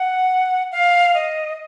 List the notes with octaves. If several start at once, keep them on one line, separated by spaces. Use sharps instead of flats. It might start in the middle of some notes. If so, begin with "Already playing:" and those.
Already playing: F#5
F5
D#5